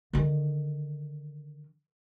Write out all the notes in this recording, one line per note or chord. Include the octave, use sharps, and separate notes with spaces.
D3 D#3